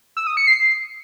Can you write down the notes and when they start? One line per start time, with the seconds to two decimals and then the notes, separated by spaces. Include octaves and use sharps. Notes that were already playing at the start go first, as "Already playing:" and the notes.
0.17 E6
0.27 D#6
0.37 C#7
0.47 C7